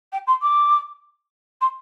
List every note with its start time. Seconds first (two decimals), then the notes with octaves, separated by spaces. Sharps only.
0.12 G5
0.27 C6
0.41 D6
1.61 C6